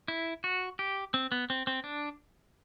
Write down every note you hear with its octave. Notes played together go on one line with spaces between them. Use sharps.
E4
F#4
G4
C4
B3
C4
C4
D4